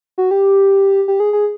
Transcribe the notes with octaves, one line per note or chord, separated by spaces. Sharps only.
F#4
G4
G4
G#4
G#4